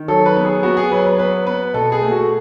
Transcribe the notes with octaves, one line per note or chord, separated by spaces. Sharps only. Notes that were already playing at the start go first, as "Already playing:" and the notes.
Already playing: D#3
F#3 A4
B4
B3
G#4
B3 F#4
G#4
F#3 B4
B4
B3 B4
B3 B4
B2 A4
G#4
A3
F#4